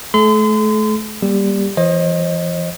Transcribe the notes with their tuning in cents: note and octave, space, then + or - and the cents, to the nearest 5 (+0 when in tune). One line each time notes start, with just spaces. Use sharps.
A3 -35 A4 -40 C6 -35
G3 +0 A#3 +20 G4 +15
E3 +40 C5 +40 D#5 +0